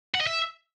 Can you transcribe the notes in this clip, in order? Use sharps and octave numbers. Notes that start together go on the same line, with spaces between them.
F#5
D#5
E5